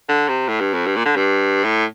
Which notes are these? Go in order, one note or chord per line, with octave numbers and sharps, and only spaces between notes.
D3
C3
A2
G2
F2
G2
A#2
D3
G2
A2